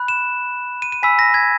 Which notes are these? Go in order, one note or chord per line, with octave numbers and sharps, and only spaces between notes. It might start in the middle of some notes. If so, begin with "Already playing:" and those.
Already playing: B5 F#6
E7
D#7
D#7
G#5 B5 E6 B6
A#6
G#6